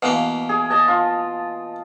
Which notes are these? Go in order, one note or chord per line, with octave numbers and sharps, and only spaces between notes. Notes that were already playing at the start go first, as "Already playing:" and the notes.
B2 E3 A#3 F5
G#4
D#5 A5
F4